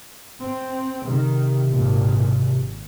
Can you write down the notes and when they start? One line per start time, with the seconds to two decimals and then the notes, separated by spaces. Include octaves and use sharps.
0.41 C4
1.07 C3 D#3
1.70 G#1 A#2